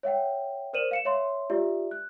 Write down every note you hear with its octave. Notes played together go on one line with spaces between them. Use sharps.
C#5 E5 F#5 G5
A#4 C5 D5 D#7 E7 F#7
F5 C#7 E7
C#5 E5 C6
F4 G4 D5 E5
F#6